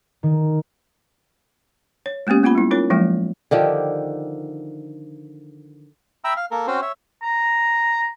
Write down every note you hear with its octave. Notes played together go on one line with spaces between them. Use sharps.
D#3
C#5
G#3 A#3 B3 C#4 G4
A#3 B3 F4 F#5 B5
G3 E4
C#4 D#4 F4 A#4 C#5
F3 F#3 G#3 A#3 G5
D3 D#3 F3 G4
E5 G5 A#5 B5 E6
F5
A#3 A4 A#4
C4 C#4 F#4 C5
C#5 E5
A#5